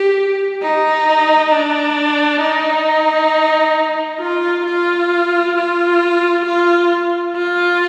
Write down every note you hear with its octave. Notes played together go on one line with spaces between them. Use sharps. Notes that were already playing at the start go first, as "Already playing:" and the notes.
Already playing: G4
D#4
D4
D#4
F4
F4
F4
F4
F4